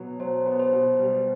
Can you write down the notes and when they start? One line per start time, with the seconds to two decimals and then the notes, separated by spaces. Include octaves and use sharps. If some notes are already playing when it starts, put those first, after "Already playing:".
Already playing: B2 F#3 B3
0.20 F#3 C5
0.46 B3
0.59 C5
0.72 B2
0.99 G3